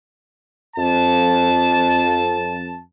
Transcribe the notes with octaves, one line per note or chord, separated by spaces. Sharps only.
F2 A5